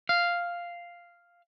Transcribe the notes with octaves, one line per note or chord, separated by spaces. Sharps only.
F5